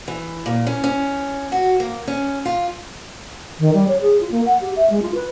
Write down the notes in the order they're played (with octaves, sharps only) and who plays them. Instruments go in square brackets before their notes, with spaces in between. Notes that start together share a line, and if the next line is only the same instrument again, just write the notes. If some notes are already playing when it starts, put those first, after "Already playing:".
[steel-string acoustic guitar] E3
A#2
C#4
C#4
F#4
A#3
C#4
F4
[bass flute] D#3
G3
C#5
G#4
F4
A#3
F#5
G4
E5
G#3
F4
B4